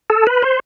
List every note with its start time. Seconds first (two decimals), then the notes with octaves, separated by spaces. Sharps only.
0.10 A4
0.27 B4
0.42 C5